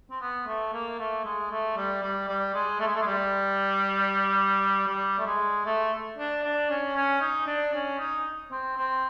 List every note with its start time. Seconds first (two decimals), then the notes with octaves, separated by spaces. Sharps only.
0.10 C4
0.21 B3
0.46 A3
0.73 A#3
0.99 A3
1.24 G#3
1.50 A3
1.77 G3
2.02 G3
2.29 G3
2.54 G#3
2.80 A3
2.87 G#3
2.96 A3
3.02 G#3
3.06 G3
4.88 G3
5.18 A3
5.26 G#3
5.65 A3
6.17 D4
6.43 D4
6.70 C#4
6.95 C#4
7.21 D#4
7.46 D4
7.73 C#4
7.99 D#4
8.51 C4
8.77 C4